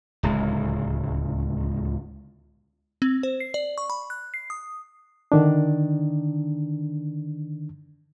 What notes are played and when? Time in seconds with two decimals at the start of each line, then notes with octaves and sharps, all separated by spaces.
0.23 D1 C#2 G#3
3.02 C4
3.23 C5
3.40 C7
3.54 D5
3.78 C#6
3.90 B5
4.10 F#6
4.34 C7
4.50 D#6
5.32 D3 D#3 D4